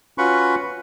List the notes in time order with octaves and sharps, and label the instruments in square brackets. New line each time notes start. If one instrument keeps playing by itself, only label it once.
[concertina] C#4 F4 F#4 B4 B5 C#6